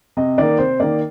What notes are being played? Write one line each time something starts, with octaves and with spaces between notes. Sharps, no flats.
C3 D#5
D#3 A#3 D5
C3 C5
D#3 A#3 D5